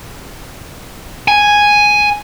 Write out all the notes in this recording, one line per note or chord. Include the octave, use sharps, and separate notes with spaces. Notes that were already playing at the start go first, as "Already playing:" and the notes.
G#5